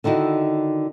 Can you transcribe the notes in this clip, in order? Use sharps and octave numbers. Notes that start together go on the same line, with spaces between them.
D3 D#3 D#4 E4 F#4